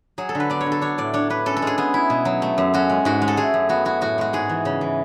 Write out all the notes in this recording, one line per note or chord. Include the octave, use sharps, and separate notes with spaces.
F#3 G#4
A4
D3
B4
B3 D5
C#5
D3
A4
D4 C#5
A2 D5
D4 C#5
D4 B4
C#4 A4
A4
G#3 G#4
B3 G#4
E4
B2
F#3
A3
F#2
C#4 F#4
G#3
G#2 F#4
G#3
A4
A3 G#4
F#2
B3 F#4
E4 F#4
A2 F#4
G#3 F#4
G#2 G#4
E3
C#3
E3